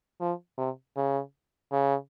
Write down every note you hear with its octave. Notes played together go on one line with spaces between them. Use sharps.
F3
C3
C#3
C#3